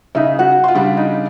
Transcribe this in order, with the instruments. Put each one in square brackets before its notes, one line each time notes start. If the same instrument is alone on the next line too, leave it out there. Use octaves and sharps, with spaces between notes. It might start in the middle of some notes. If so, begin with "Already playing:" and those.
[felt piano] C#3 [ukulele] D#4 E5
[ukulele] F#4 F#5
[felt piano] F4 C6
C#3 G3 D4
[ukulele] D#4